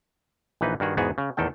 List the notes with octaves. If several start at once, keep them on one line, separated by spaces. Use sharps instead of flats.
A#1 E3 D#4 B4
G2 D#3 F#4 G#4
E2 G#2 B3 F#4 G#4
C#3
E2 A2 D#3 A4 G5